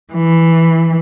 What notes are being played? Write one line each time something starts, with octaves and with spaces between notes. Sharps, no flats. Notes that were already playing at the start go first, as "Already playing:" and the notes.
E3